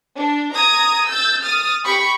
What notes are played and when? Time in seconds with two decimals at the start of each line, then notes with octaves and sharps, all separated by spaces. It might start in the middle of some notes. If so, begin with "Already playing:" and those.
0.17 D4
0.54 A#5 D#6 G#6
1.09 E6 G6 A6
1.42 D#6 F6 A6
1.85 G4 G5 B5 C#6